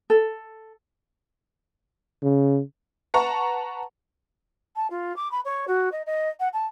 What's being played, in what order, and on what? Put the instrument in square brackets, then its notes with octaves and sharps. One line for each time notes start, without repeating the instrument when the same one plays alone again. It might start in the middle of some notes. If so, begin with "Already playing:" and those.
[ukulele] A4
[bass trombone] C#3
[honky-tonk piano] B4 F#5 A5 A#5 C#6
[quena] A5
F4
D6
B5
C#5
F#4
D#5
D#5
F#5
A5